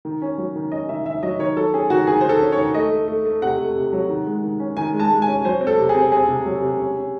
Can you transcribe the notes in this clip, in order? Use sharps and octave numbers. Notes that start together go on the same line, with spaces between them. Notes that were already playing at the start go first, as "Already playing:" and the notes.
D#3
C#4
F#3
D#3
C#4 D#5
D#3 E5
D#3 E5
F#3 D#5
D#3 C#5
F#3 A4
C#4 G#4
D#3 F#4
D#3 G#4
D#3 C5
A4
C#4
D#3 C#5
A3 D#5
A3
A3
A3
C3 F#5
A3
C3
F#3
D#3
G#3
D#3
C#4
D#3 G#5
G#3
A5
G#3
G#5
C#4
F#3 C5
C4
A4
C3
G#4
C4
C4 G#4
C3
F#3
C3
C#4
C#4